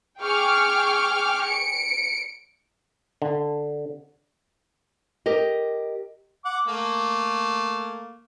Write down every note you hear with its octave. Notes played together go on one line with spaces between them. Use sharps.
G#4 G5 C#6 D6 F6
C#7 D7
D3
G4 A#4 D#5
F#5 D6
A3 A#3